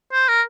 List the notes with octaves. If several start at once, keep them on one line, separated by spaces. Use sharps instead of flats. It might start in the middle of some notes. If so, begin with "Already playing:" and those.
C5
A#4